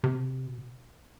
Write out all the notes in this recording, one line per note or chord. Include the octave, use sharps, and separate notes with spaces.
C3
B2